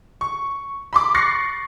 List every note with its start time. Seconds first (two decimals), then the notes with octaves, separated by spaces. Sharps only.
0.21 C#6
0.93 B5 C6 D6
1.14 C#6 F#6 A6 A#6 C7 C#7